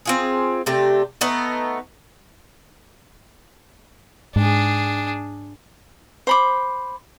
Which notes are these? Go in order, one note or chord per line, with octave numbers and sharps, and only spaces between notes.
C4 F4 G#4
C3 A3 D4 G4
A3 B3 D#4 A4
G#2 D4 G#4
C5 B5 D6